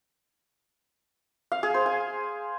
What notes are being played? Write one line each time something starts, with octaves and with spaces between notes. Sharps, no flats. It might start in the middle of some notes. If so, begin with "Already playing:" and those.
F5
G#4
C5
G#5